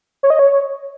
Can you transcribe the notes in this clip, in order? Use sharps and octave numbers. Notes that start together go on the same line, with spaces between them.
C#5
D#5
C#5